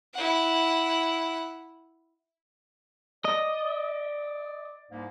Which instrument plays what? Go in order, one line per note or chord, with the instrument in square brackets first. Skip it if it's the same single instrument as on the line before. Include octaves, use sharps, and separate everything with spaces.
[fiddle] E4 F#5
[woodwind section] D5 [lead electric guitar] D#5
[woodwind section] C2 G#2 A#3